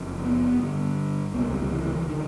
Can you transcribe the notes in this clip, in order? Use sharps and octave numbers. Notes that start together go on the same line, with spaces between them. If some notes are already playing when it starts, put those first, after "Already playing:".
Already playing: F#1 F2
B3
G1 G2 D3
C#2 C3 B3
A#3
G3
D#3
E3
E3
E3
D3 D#3